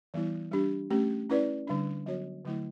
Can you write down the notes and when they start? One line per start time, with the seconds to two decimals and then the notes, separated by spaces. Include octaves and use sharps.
0.14 E3 G3 B3 E4
0.51 G3 D4 G4
0.90 A3 C#4 G4
1.30 C#4 E4 B4 D5
1.67 D3 G3 D4
2.06 F#3 B3 F#4 C#5
2.45 D3 F#3 A3 E4